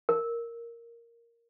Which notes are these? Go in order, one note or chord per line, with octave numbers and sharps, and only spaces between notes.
A#4